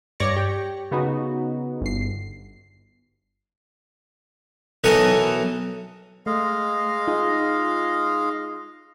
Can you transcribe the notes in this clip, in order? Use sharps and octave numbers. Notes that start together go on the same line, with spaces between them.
G2 C#5 D5 A#6 C#7
G4
C#3 B3 D#4 F#4
G1 C7
B1 E3 A4 A#4 C#6 D#6
G#3 A3 D#5 F5
D#4 F4 G#4